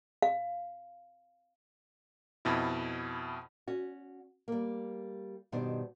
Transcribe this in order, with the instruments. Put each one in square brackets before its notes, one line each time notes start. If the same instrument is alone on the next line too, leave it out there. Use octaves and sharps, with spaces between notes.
[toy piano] F5
[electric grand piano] F2 B2 E4
[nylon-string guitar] C#4 F#4
G3 A#3
G2 B2 D#3 D4 G4 C5